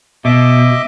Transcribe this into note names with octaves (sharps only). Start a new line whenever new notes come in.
B2 D#5 E5 D6